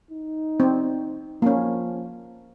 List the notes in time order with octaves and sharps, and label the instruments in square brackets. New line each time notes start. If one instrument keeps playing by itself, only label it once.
[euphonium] D#4
[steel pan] C4
[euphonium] F3 [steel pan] A#3 C#4